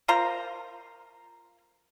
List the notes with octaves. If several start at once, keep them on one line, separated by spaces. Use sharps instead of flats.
F4 A#4 C5 A#5